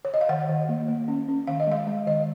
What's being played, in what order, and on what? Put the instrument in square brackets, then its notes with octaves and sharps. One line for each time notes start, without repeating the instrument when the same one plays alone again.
[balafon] C#5
D#5
F5
D#3 F#5
D#3
A#3
A#3
C#4
C#4
D#3 F5
D#5
G#3 F5
G#3
D#3 D#5